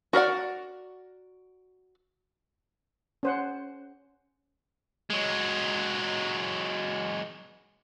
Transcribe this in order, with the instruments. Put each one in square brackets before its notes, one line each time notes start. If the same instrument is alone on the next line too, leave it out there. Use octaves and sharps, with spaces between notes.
[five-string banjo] F#4 A#4 D5 F#5
[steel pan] C#4 C5 F#5
[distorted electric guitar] F#3 G#3